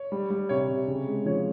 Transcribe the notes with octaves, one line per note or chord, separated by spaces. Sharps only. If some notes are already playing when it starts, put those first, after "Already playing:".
Already playing: C#5
G3
G3
C3 C#5
C3
C#3
G#3
F3 C#5